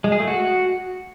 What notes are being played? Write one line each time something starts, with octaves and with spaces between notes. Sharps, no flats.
G#3
G#4
A3
F#4